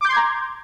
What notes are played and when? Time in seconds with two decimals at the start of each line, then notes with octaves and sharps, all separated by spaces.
0.01 D6
0.05 G6
0.09 C6
0.13 G#6
0.17 A#5